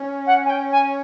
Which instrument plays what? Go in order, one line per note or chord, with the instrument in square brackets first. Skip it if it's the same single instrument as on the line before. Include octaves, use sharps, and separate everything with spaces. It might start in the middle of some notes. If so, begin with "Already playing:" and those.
Already playing: [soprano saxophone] C#4
[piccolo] F#5
G#5
G5
G#5